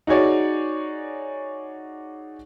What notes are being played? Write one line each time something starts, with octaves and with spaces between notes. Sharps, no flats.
D#4 F#4 G#4 C#5 D5